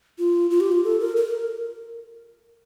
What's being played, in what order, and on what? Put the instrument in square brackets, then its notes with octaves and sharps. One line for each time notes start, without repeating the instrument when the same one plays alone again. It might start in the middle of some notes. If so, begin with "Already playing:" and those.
[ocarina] F4
F4
G4
F4
A4
A#4
A#4